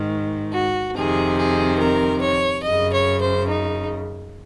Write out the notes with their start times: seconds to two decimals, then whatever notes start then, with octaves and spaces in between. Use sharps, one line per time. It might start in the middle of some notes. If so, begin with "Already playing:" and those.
Already playing: G#2 D#3
0.53 F#4
0.96 F2 C3 D#3 G#4
1.38 G#4
1.80 A#4
2.21 C#5
2.64 F#2 C#3 D#5
2.93 C#5
3.21 C5
3.48 D#4